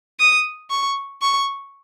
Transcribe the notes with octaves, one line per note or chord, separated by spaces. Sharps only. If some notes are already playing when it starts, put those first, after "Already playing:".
D#6
C#6
C#6